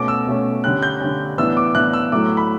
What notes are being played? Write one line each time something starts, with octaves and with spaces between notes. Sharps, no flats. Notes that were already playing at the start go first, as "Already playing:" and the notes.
Already playing: B2 A3 C#4 D6
E6
B2 A3 C#4
D3 G3 C#4 F#6
G6
D3 G3 C#4
A2 E3 B3 D4 E6
D6
A2 E3 B3 D4 F#6
E6
A2 F#3 A3 D6
B5